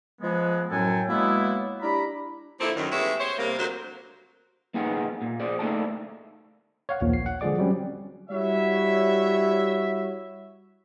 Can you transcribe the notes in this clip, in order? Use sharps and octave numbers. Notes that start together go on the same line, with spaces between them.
F3 G#3 B3
F#2 A2 F#3 A4 G5 G#5
F#3 G#3 A#3 B3 E4
D4 E4 G4 A#5 B5
D3 F3 A#3 C4 E4 A4
F#2 D#3
E2 G#3 A3 C#4 G4 E5
C5 C#5
C3 G3 A#3
D2 F#3 A#4 C5
A#3 B3 D#4 G#4 F#5
A#2
G#4 C5 D5
A3 A#3 D#4 A4 D5 A5
C#5 F5 F#5
A#1 D#2 A#2 F3 A#3
C7
F#5
D3 F3 G#3 G#4 D5 D6
F#3 G3 C4 C#4
G3 E4 F#4 C#5 E5